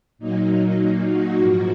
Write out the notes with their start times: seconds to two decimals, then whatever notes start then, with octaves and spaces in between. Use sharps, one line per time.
0.18 A#2 F#3 A#3 D#4
1.07 F#4
1.37 G#2 F3 A#3 F#4